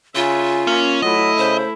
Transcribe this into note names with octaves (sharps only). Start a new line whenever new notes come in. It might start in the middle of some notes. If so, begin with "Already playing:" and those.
C#3 F4 E5 G#5
A#3 C#4
F#3 A3 E4 D#5
C#3 C5